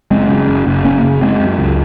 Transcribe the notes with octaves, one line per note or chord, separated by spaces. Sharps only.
F#1 G#3 C4
C#3
F#1
F#1
C#3 A#3 C#4
F#1
F#1 G#3 C4
F#2
C#2